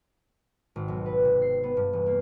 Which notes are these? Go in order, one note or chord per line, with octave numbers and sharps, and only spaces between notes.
G#1
B1
B4
C3
C7
B3
G2
E1
A#3